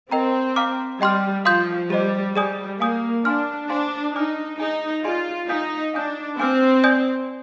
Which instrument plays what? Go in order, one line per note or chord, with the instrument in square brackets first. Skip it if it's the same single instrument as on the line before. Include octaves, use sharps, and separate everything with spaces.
[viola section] C4 [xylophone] A#4 D#5 G5 A#5
[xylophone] F5 A#5 D6 F6
[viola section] G3 [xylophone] D#5 G5 C6 F6
[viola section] F3 [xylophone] F5 C6 D#6 G6
[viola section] G3 [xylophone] G4 C5 D#5
[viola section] G3 [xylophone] G#4 D5 G#5 D#6 G6
[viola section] A#3 [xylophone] F5 G#5 D#6 G6
[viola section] D4 [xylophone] F5 G#5 C6 F6
[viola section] D4 [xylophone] C5 F5 G#5 C6
[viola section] D#4 [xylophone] D5 G#5 D6 F6
[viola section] D#4 [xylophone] G#4 D#5 G#5
[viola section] F4 [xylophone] G#4 D5 G#5 C6
[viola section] D#4 [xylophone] F5 G#5 D#6 G6
[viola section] D4 [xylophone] F5 G#5 D#6 G6
[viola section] C4 [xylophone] F5 G#5 D6 F6
[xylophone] D5 G#5 D#6 G6